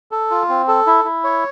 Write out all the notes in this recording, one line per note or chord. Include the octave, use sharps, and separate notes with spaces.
A4
F4
C4
A4
E4
E4
C#5